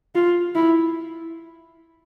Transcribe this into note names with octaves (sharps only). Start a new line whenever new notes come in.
F4
E4